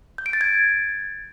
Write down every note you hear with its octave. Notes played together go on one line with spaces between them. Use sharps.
G6
D7
A6
G#6